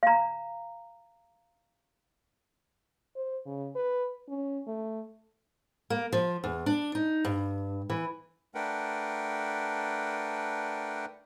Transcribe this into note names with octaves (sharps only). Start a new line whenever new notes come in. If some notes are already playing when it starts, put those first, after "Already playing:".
F5 A#5
C5
C#3
B4
C#4
A3
A#3
F3
E2
D4
D#4
G2
E3
A3 D4 A#4 B4 F#5 G5